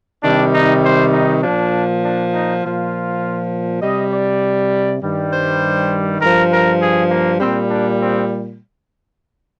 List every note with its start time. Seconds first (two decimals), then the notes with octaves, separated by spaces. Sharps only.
0.24 C3 D#3 G3 D4
0.54 D#4
0.84 C5
1.13 D#4
1.43 A#2 F3 D4
2.03 D4
2.33 D#4
2.63 A#2 F3 F4
3.82 C3 G3 D#5
4.12 D5
5.02 G2 D#3 G3
5.32 C5
6.21 G2 F3 A#4
6.52 A#4
6.81 G#4
7.11 A#3
7.40 A#2 G3 C4
7.70 D4
8.01 C4